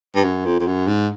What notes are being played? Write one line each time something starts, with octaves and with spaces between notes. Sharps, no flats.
G2
F#2
F2
F2
F#2
G#2